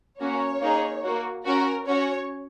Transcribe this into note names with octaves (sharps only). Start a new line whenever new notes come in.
A#3 C#4 F#4 C#5
A#3 D#4 G#4
A#3 F#4
C#4 F#4 A#4
C#4 F#4 C#5